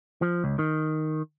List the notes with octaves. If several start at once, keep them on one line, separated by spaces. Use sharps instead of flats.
F3
C#2
D#3